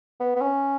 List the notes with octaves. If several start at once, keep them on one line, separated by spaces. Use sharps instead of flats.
B3
B3
C#4